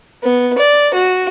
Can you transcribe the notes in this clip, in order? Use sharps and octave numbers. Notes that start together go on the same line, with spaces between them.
B3
D5
F#4